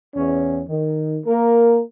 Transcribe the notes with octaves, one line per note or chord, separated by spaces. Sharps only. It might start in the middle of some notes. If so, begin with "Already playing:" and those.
E2 C#4
D#3
A#3 A#4